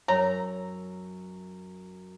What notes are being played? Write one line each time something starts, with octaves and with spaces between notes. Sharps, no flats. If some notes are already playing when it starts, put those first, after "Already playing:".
F#2 C#5 A#5 E6